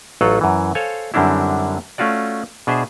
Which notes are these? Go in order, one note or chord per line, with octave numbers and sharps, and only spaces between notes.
A1 F#3 F4 A4 F#5
F#2 E3
A4 C5 C#5 F5 G#5
F#2 D3 G3 C4 D4 E4
A3 C#4 F4 F#4 D5
B2 D4 G#4 C5 E5